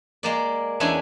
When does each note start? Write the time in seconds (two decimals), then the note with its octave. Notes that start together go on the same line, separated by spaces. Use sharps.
0.23 G#3 A#3 D5
0.80 E2 C#4 D4 E4 E5 G#5